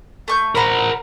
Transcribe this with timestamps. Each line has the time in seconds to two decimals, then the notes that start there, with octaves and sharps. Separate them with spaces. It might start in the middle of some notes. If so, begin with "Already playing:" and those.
0.28 A3 C#6 G6
0.55 A#4 C5 F#5 A#5 B5